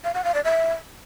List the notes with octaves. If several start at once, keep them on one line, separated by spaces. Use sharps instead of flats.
F5
F#5
F5
D5
E5